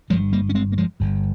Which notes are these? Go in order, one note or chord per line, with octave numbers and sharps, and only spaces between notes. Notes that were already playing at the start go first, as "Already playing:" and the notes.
G1 G2 F3 G#3
G3 A#3
C#4
G#3 C4
A#3
F3 G#3
G1 G2